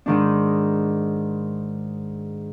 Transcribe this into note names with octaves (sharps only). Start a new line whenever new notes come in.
G#2 D#3 D4